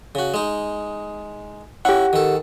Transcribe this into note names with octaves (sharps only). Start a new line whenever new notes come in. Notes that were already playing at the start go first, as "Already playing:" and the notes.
C#3 F#4
G#3 D#4
C#4 E4 G4 F#5
D#3 A4